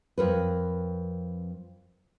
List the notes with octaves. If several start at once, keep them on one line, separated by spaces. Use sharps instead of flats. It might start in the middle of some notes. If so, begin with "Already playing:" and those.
F2 A#4 B4